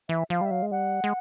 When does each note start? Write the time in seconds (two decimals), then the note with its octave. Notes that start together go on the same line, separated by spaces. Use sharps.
0.09 E3 E5
0.30 F3 F5
0.41 G3 E5
0.51 F#3 F5
0.62 G#3
0.71 G3 F#5
1.04 G#3